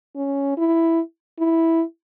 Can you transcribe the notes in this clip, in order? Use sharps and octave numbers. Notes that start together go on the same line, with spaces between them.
C#4
E4
E4